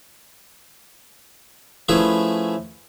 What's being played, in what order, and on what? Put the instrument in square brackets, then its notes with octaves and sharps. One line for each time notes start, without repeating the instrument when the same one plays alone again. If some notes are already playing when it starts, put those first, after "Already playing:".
[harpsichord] F3 A3 C#4 E4 G#4 B4